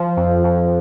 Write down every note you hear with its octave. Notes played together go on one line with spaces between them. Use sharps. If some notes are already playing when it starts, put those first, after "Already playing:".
Already playing: F3
F2
F2